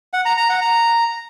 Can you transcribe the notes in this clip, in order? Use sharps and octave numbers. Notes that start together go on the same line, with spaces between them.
F#5
A#5
A#5
F#5
A#5